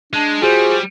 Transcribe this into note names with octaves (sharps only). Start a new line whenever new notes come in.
G#3 D4
G3 F4 F#4 G#4 C5